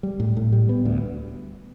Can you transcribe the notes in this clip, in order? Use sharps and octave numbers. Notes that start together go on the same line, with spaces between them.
G3
A2
A2
G3
B3
D2